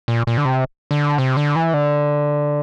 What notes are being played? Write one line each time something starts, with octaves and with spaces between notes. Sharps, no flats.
A#2
A#2
D3
C3
D3
C3
D3
E3
D3